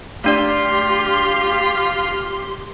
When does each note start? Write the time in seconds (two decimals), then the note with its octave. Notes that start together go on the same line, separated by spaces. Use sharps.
0.24 A3 D4 F4 G4 D5 C6